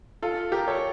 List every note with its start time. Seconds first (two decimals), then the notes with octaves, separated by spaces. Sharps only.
0.22 F4 A4
0.52 G4 A#4
0.68 A4 C#5